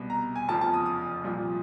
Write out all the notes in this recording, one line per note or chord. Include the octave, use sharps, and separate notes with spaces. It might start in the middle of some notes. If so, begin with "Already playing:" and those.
Already playing: C2 B2
A#5
G#5
F1 E2 C#3 F3 A5
A5
D#6
D#6
C2 A#2 F3